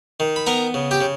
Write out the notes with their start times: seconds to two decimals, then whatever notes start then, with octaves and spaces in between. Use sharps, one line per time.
0.20 D#3
0.36 B5
0.46 B3 A#4 A#5
0.74 C#3
0.91 G4 G5
1.01 C#3